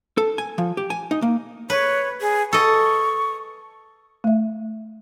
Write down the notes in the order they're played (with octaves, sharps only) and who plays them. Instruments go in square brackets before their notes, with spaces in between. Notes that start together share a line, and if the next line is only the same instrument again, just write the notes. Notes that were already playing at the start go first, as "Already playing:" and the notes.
[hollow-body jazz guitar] A4
G#5
F3
G4
G#5
D#4
A#3
[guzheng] B4 [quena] C#5
[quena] G#4
[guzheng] A4 D#5 [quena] C#6
[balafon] A3 E5